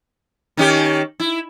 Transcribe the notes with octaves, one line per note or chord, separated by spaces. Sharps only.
D#3 C#4 G4
E4